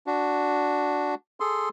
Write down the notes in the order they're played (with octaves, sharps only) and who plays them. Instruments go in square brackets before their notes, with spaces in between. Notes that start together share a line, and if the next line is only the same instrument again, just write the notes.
[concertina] D4 F#4
G#4 A4 C6